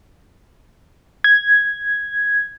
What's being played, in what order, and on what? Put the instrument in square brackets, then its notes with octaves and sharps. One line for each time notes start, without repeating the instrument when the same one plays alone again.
[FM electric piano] G#6